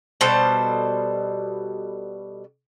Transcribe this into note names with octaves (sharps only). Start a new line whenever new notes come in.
B2 G3 A4 C5